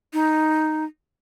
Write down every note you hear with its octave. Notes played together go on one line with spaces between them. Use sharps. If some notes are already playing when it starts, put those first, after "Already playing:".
D#4